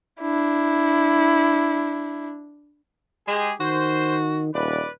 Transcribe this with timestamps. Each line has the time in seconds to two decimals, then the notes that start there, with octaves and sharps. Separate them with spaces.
0.21 D4 E4
3.27 G#3 G4 G#4
3.60 D#3 F#4 C5
4.54 D#1 B4 D5